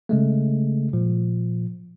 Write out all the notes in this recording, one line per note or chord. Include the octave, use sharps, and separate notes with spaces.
C#3 G#3 A3
A#2 F3